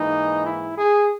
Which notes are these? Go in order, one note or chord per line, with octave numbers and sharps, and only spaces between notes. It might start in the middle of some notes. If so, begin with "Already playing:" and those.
Already playing: G#2 E3 A#3 D#4
E4
G#4